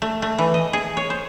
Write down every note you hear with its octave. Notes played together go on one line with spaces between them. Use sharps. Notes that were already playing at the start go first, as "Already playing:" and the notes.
A3
A3
E3
D#5
G#4
C#5
C5